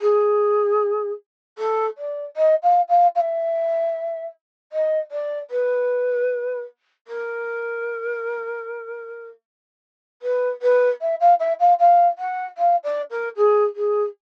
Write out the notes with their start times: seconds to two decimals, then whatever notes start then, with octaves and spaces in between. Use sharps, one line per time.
0.01 G#4
1.58 A4
1.98 D5
2.37 D#5
2.63 F5
2.89 F5
3.15 F5
3.20 E5
4.72 D#5
5.11 D5
5.51 B4
7.08 A#4
10.22 B4
10.62 B4
11.01 E5
11.20 F5
11.40 E5
11.60 F5
11.80 F5
12.18 F#5
12.58 F5
12.84 D5
13.11 A#4
13.37 G#4
13.76 G#4